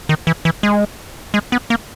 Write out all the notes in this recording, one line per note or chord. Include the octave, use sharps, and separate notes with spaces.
D#3
E3
E3
G#3
G#3
B3
A#3